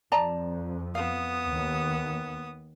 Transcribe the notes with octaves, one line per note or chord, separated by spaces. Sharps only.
F2 D5 A5 A#5
B3 F5 D#6
D#2